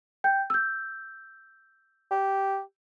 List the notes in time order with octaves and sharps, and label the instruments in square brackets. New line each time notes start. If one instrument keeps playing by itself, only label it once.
[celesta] G5 G6
E6 G6
[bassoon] G4